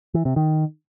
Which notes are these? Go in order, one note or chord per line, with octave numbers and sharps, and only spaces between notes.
E3
C3
D#3